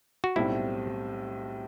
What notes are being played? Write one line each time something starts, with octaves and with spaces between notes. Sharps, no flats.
F#4
B1 A2 G3 C4 E4